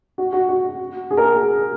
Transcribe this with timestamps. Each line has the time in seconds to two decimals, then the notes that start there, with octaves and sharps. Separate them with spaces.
0.18 F#4
0.33 F#4
0.49 F#4
1.11 G#4
1.17 A#4
1.24 G#4